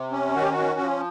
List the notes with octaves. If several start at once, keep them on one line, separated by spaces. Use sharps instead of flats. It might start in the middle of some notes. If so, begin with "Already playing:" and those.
Already playing: C3
C#4
D#3 F#4
G4
F#4
C#4
F3